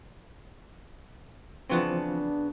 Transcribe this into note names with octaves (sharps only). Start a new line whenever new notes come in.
C#3 E3 F3 B3 C4 D4 A5